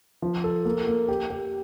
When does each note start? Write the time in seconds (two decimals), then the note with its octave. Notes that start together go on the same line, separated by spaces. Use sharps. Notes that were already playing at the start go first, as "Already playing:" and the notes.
0.22 F3
0.44 A4
0.65 A#3
0.87 A#3
1.09 G4
1.30 G4